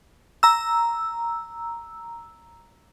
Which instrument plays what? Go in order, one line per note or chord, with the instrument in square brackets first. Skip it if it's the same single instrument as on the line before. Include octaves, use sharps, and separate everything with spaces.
[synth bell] A#5 E6